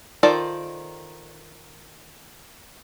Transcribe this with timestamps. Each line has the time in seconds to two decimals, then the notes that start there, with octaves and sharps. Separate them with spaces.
0.23 D#3 F4 A4 C5 D5